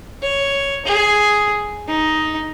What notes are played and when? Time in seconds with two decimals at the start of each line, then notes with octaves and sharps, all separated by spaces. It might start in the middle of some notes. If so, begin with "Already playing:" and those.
0.23 C#5
0.86 G#4
1.88 D#4